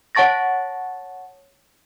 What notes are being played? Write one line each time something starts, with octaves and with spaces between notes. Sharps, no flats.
C#5 F#5 A5 C#6 A6 A#6